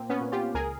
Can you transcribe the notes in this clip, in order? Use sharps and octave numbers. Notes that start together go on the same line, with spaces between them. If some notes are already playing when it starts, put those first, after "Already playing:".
Already playing: A#2 A#3 C4
B3 C#4
A#2
F4 G4
C#2 G#4 A#4